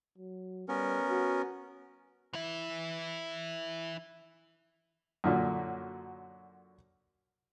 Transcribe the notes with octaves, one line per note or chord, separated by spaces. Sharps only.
F#3
G3 B3 C#4 A#4
F#4
E3 E4
F#2 A#2 D3